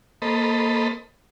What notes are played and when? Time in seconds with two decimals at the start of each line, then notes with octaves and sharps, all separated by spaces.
0.22 A#3 A4 C5 D#5 B5